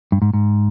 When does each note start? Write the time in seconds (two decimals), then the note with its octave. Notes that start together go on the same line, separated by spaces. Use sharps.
0.12 G2
0.22 G#2
0.34 G#2